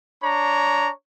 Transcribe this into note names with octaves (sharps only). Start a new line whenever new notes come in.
D4 C#5 A#5